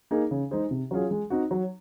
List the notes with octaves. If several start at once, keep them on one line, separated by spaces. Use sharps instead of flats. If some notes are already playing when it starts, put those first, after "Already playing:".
A#3 D#4 G#4
C#3
G#3 D#4 G#4 C5
C3
F#3 C#4 F4 G#4
G#3
C4 D#4 F#4
F#3